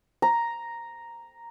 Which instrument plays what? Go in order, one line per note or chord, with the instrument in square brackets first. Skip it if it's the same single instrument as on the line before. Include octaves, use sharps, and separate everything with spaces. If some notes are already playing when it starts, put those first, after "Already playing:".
[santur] A#5